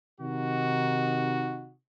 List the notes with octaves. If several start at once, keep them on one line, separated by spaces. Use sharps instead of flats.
C3 D#3 D#4 F#4